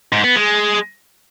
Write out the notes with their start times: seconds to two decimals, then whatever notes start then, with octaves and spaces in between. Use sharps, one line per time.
0.12 G#2
0.24 B3
0.36 G#3